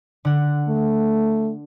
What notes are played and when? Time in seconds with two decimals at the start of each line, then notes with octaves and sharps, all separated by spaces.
0.25 D3 F#5
0.68 A3